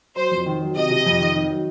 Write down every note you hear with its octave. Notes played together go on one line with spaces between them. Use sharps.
F#3 C5
F2
D#3
F#3
C3 D#5
C3
F2
D#3
D#4
F#3